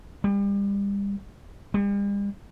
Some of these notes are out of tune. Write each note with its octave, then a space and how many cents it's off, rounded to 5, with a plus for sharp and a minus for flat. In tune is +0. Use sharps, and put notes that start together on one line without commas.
G3 +35
G3 +45